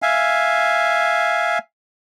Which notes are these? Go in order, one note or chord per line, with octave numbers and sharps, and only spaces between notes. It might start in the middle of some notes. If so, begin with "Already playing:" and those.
E5 F5 G#5